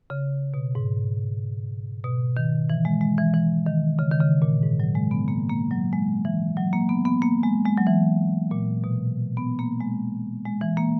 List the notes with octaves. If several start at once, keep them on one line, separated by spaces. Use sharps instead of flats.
C#3
B2
G#2
B2
D#3
E3
G#3
G#3
E3
E3
D#3
C#3
D#3
C#3
A#2
G#2
F#3
G#3
B3
A#3
A#3
F#3
G#3
E3
F#3
A#3
B3
B3
A#3
G#3
G#3
F#3
E3
A#2
B2
B3
A#3
G#3
G#3
E3
A#3